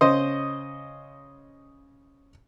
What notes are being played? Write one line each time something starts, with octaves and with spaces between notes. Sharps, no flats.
C#3 C5 D#5